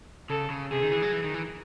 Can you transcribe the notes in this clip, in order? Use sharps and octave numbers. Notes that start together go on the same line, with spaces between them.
C#3 A4
C#3
C3 G#4
D#3
E3
F#3
E3
D#3
E3